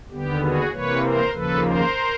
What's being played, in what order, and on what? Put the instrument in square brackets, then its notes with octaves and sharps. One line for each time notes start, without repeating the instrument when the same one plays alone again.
[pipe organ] D#2 D3 G3 B3 G4
F#4 G#4
C3 E3 G3 A#3 B4 C#5
A#4 C5
D#2 C#3 F3 A#3 A4 B4
A#4 C5